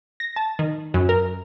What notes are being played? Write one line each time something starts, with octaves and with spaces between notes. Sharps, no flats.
A#6
A5
D#3
F#2
A#4